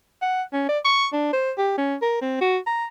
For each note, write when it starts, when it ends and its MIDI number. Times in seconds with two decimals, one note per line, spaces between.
0.22 0.42 78
0.53 0.67 61
0.69 0.79 74
0.85 1.07 85
1.13 1.33 62
1.33 1.52 72
1.58 1.74 67
1.78 1.95 61
2.02 2.20 70
2.22 2.39 60
2.41 2.58 66
2.67 2.85 82